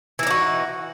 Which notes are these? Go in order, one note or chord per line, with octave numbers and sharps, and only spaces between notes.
E3 D4 D#4 F#4